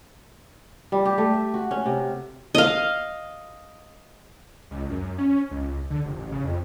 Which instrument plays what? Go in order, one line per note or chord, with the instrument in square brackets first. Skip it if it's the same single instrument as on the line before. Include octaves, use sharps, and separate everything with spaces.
[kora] G3
G4
A3
E5
F#4
C#4
C3
[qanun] D#5 F5
[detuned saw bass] C#2
F#2
C#4
C#2
D3
F1
A1
C#3
F2